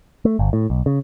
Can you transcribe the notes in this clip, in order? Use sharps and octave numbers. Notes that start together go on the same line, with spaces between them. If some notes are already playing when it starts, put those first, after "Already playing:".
A3
G1
A2
B1
C#3